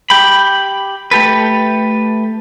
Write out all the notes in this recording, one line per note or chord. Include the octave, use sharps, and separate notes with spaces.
G4 G5 B5
A3 G4 A4 B4